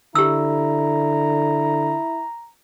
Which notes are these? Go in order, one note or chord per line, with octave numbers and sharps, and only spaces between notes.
D3 E4 G4 A#5 E6